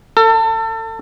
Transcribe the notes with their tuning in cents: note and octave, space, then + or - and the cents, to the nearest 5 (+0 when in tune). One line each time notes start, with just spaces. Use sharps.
A4 +30